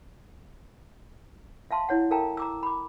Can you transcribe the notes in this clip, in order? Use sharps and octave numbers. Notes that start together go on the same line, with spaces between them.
E5 F5 A5 C6
E4 C#5 F#5
A4 A#4 F5 G5 A5 A#5
A#5 D6 E6
B5 D6